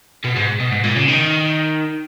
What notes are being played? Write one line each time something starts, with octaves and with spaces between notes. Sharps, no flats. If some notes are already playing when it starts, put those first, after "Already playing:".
B2
G#2
B2
G#2
A#2
C#3
D#3